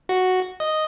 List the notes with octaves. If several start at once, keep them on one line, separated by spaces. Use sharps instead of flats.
F#4
D#5